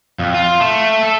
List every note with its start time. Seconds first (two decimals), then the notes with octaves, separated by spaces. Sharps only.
0.19 F2
0.34 F4
0.61 A3
1.03 A4